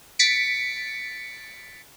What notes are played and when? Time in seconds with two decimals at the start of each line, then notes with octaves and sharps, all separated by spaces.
0.19 A6 B6 C#7 D7